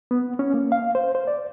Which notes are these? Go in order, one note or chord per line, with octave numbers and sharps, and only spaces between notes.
B3
C#4
A#3
F5
C5
C5
D5